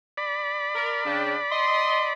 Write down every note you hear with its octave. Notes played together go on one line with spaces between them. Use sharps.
D5 B5
A#4
C#3 D4 G5
D#5 C6